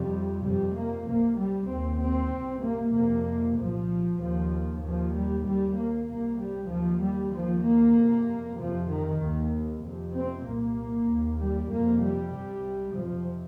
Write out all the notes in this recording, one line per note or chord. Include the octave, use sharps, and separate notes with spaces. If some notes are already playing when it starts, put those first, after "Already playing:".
Already playing: F2 C3 G3
F2 C3 G3
A#3
C2 C3 A#3
G3
D#2 C4
C4
C2 C3
A#3
F2 C3 A#3
C2 A#2 F3
D#2 F3
D#2 F3
G3
D#2 G3
A#3
C2 C3 A#3
G3
D#2 F3
G3
D#2 F3
A#3
F2 C3
F2 C3 F3
D#3
D#2
F2 C3
C4
C2 A#2 A#3
D#2
G3
F2 C3 A#3
G3
C2 C3
F2 C3 F3